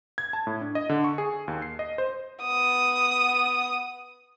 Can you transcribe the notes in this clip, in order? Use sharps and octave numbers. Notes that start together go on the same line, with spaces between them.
G#6
A5
A2
D4
D#5
D3
C#6
G#4
D#2
C7
D#5
C5
B3 D#6